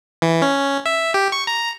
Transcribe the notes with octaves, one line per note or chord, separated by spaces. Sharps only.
E3
C#4
E5
G4
C#6
A#5